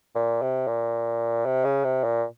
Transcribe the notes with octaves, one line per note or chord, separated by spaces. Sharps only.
A#2
C3
A#2
C3
C#3
C3
A#2